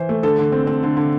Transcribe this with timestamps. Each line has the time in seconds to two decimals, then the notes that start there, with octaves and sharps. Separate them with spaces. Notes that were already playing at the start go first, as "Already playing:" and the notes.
Already playing: E3 C5
0.09 A3
0.23 D3 A4
0.38 D3
0.52 C4
0.67 C4
0.83 D3
0.97 D3